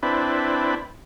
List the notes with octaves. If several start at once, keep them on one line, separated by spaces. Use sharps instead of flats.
C4 D4 E4 B4